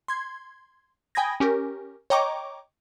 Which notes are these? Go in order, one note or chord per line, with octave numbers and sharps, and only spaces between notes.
C6 G#6
G5 G#5 B5 D#6 G#6 A#6
C#4 G4 A#4
C#5 D#5 G5 A#5 C#6 D6